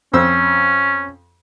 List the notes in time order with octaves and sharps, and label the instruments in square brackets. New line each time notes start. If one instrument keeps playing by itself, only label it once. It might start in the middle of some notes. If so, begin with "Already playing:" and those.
[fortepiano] F2 C5 E6 [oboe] C#4